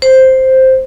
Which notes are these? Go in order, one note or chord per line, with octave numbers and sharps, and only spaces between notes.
C5